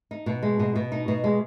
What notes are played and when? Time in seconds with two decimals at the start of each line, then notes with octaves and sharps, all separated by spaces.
0.11 D#4
0.26 B2
0.43 G#3
0.60 B2
0.75 B2
0.92 D#4
1.08 B2
1.24 G#3